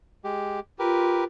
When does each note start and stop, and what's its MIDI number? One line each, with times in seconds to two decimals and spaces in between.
0.24 0.60 56
0.24 0.60 67
0.79 1.22 65
0.79 1.24 67
0.79 1.24 70
0.79 1.24 71